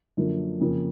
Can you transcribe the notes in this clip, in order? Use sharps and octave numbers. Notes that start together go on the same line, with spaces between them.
F#2 D3 F3 A#3
F2 C#3 F3 A#3